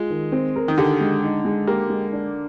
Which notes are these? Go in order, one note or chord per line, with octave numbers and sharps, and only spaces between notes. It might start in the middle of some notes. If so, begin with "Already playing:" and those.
Already playing: G#3 F4
D#3
C4
A#4
D#3
D3 G4
G#3
D#4
G#3
A#3 G4
G#3
D4